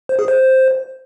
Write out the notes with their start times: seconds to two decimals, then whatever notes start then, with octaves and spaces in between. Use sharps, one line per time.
0.09 C5
0.19 G#4
0.28 C5